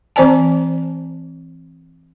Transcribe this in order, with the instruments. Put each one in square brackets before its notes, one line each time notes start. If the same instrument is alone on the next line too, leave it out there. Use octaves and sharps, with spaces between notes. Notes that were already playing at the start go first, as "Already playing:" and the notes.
[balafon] E3 C4 C5 D5 G#5 A5